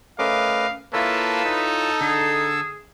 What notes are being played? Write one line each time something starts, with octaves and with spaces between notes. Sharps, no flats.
A3 C#4 A#4 B4 D#5 F5 D6
A#3 E4 F4 A4 B4 C#5 A5 E6
D#4
D3 G#4